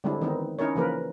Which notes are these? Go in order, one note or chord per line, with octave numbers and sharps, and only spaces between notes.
D3 G3 G#3 C4 D4 E4
D#3 E3 B3 C4 D#4
C#4 D#4 E4 A#4 C#5
C#3 E3 F3 A#3 A#4 B4